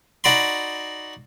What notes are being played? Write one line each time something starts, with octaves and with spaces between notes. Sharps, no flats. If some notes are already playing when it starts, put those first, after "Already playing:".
D#4 F#4 D5 B5 C6